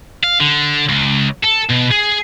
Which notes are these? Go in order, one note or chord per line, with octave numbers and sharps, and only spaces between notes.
F5
D3
C#2
A4
B2
G#4